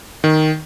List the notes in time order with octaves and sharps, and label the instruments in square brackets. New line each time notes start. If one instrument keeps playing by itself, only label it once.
[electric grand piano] D#3